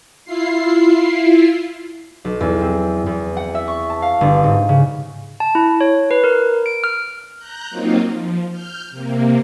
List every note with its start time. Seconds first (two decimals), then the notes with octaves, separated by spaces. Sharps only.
0.25 E4 F4 C7
2.25 B1
2.40 E2
2.61 C4
3.06 E2
3.37 F#5
3.55 E5
3.68 C#6
3.90 A5
4.02 F5
4.21 G1
4.44 G#2
4.69 C#3
5.40 A5
5.55 E4
5.81 C#5
6.11 B4
6.24 A#4
6.66 D7
6.84 F6
7.37 A#5 F#6 G6
7.70 F#3 A#3 C4 D#4 F4
8.11 F3
8.50 F6 G6
8.91 C3 A#3